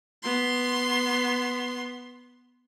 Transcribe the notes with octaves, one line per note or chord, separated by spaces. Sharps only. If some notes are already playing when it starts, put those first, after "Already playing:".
B3 C6